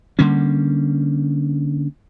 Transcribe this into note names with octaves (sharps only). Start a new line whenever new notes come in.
D3 G3 A#3 C#4